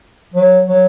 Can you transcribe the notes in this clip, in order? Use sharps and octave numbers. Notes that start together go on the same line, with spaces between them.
F#3
F#3